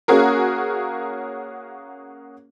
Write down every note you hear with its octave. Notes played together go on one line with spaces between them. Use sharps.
A#3 C#4 F#4 G#4 A#4